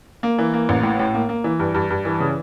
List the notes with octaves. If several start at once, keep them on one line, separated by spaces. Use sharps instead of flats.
A#3
E3
A#3
A1
A2
A2
A#3
A#3
E3
G2
G2
G2
E3
C#3